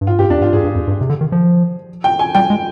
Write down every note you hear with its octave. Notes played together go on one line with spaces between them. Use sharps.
G2
G#2 F4
G2 G4
F2 D4
G2 F4
G#2 G#4
G2
F2
G2
C3
D3
D#3
F3
G5
G#5
G3 G5
G#3